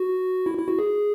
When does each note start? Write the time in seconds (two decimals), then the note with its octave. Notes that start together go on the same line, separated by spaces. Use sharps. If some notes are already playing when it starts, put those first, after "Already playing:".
Already playing: F#4
0.46 E4
0.58 E4
0.68 F#4
0.79 G#4